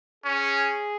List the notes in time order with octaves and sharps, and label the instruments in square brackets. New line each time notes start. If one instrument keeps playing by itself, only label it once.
[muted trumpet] C#4 [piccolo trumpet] G#4